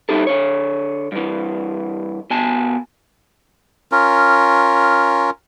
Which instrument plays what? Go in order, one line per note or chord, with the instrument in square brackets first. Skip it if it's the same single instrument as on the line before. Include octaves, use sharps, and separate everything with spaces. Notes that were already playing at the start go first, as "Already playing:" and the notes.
[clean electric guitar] G3 D#4 E4 G4 A4
D3 C#5
G2 E3
B2 G#5 A5
[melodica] C#4 F4 A#4